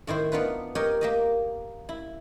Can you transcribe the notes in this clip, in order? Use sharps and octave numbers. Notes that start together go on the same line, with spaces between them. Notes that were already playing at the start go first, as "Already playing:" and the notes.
A2 D#3 E4 C5
B3 D4 D#4 F4 B4
G4 A#4 C#5 D#5 G5
A#3 G4 D#5
E4